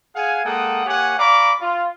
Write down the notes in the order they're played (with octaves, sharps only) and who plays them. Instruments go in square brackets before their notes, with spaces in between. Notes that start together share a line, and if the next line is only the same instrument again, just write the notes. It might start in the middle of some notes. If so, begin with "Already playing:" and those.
[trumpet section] G#4 F5 F#5 G#5
G#3 A#3 A4 F#5 G5 D#6
A#3 G4 C#5 F#5 G#5
D5 F5 A#5 B5 C#6 D6
F4